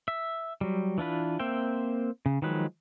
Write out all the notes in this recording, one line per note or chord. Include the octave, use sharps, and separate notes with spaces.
E5
F#3 G3
E3 D4 F4 B4
A#3 C4 C5 E5 G5
C#3
D#3 F3 F#3 G#3 B4